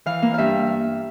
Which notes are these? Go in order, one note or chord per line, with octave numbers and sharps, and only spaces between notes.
E3 F5
A#3
G2 E5 F5